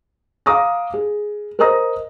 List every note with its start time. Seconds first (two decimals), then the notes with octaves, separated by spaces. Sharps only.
0.46 F5 A#5 D6 D#6 A#6
0.94 G#4
1.59 A#4 C5 D#5 A#5 D#6 A#6